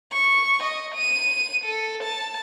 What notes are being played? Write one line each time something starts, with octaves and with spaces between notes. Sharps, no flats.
C#6
D#5
D#7
A4
A5